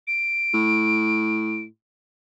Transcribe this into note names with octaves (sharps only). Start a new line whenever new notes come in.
D7
A2